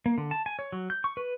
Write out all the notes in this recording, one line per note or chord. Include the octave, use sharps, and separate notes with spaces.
A#3
D3
A5
G#5
C#5
F#3
G6
C#6
B4